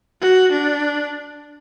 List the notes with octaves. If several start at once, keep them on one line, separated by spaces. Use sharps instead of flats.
F#4
D4